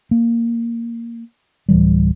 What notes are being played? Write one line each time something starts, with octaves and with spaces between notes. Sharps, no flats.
A#3
D1 E3 G3